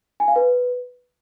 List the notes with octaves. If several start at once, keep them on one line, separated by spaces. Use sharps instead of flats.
G#5
F5
B4